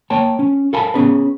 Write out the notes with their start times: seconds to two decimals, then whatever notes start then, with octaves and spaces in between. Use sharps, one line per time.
0.10 A#3 C#5 G5 A5
0.39 C#4
0.73 A4 A#4 F5 G#5 A5 B5
0.94 B3 C#4 G#4 B4